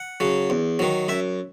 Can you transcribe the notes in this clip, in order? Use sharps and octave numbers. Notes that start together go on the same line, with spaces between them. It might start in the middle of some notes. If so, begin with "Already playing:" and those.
Already playing: F#5
C#3 F#3
E2
D#3 F#3
F#2 E5